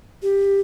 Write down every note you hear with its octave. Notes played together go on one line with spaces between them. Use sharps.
G4